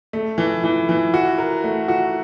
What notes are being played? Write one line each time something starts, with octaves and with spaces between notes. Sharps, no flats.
A3
E3
E3
E3
F#4
A#4
A3
F#4